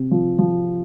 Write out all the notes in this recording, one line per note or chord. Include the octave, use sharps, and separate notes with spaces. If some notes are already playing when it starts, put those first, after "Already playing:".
Already playing: C3
F3
F3